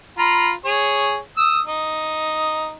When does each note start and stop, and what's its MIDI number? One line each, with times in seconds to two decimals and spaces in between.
0.18 0.52 65
0.18 0.52 82
0.18 0.52 83
0.65 1.18 68
0.65 1.18 73
1.37 1.60 87
1.37 1.60 88
1.66 2.75 63